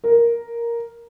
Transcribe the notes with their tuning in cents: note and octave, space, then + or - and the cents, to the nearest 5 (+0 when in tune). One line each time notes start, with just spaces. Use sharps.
A#4 +5